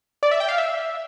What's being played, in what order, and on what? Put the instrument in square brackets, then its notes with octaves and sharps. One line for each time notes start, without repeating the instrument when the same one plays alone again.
[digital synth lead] D5
E5
G5
F5
E5